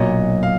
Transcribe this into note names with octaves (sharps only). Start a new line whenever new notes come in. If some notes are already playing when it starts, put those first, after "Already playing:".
Already playing: B1 A#2 F#3 D#5
F5